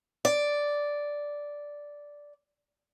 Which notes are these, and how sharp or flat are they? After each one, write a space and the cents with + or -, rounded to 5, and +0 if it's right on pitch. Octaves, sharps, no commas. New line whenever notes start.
D5 -5